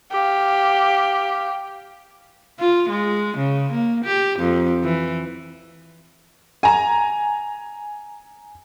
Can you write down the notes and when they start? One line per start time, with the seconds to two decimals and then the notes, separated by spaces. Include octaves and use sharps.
0.12 G4 F5
2.59 F4
2.90 G#3
3.37 C#3
3.72 A#3
4.04 G4
4.39 F2
4.84 E3
6.63 G#5 A#5